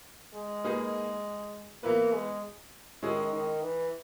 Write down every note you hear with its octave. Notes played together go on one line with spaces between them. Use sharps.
G#3
A#3 D#4 G#4 B4
E3 A#3 B3 E4 B4
G#3
D#3 G#3 C#4 E4 G#4
D#3
E3